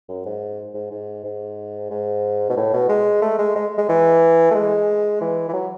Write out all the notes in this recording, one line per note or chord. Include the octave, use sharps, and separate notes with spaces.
F#2
G#2
G#2
G#2
G#2
G#2
B2
A2
B2
G#3
A3
G#3
G#3
G#3
E3
A3
G#3
E3
E3
F#3